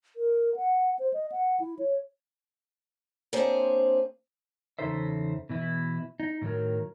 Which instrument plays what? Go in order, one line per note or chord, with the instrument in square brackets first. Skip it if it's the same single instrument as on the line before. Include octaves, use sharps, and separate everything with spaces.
[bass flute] A#4
F#5
C5
D#5
F#5
E4
C#5
[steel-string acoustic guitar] A#3 C4 D4 G#4 C5 C#5
[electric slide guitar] E2 C#3 D#4 A4 C5 E5
B2 E3 E4
D#4
A2 D#3 F#3 A#4